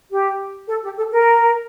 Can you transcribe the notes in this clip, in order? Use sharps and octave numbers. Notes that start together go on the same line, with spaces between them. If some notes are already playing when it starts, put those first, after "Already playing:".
G4
A4
G4
A4
A#4